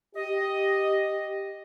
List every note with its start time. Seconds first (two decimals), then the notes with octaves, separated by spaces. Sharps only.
0.16 G4 D#5